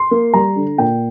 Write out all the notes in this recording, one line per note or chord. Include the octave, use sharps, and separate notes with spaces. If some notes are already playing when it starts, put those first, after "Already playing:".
Already playing: C6
A#3
G3 A#5
D3
A#2 G5